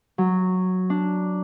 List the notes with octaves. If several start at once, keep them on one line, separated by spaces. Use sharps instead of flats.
F#3
D4